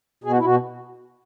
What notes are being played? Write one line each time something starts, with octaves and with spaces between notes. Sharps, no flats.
B2 G#4
F#4
E4
B2 F#4